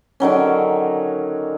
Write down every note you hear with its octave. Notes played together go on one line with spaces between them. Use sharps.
D3 D#3 F#3 C#4